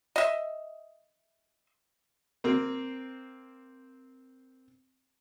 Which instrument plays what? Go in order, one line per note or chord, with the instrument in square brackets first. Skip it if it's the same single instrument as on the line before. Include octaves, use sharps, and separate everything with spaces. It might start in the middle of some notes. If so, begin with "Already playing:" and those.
[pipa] D#5 E5
[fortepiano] A#3 C4